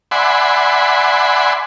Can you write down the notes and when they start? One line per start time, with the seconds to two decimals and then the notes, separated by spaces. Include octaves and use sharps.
0.11 D5 E5 F#5 G#5 B5 C6